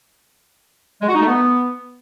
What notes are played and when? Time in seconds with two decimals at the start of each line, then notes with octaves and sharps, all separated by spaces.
1.02 G#3
1.08 F#4
1.15 D#4
1.21 A3
1.28 B3